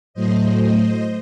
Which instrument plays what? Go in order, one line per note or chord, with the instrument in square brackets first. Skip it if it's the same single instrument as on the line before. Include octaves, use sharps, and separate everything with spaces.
[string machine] A2 F#3 A3 C5 D#5
C5 D#5